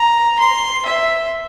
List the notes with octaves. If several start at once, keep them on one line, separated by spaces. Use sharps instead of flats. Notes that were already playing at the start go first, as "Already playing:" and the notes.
Already playing: A#5
C6
E5